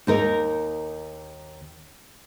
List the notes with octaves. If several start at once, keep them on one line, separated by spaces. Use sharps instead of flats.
D#2 D#4 A#4